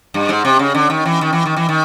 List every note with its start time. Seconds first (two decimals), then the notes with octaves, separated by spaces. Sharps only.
0.14 G2
0.29 G#2
0.45 C3
0.59 C#3
0.75 D3
0.90 D#3
1.06 E3
1.21 D#3
1.33 E3
1.46 D#3
1.57 E3
1.69 D#3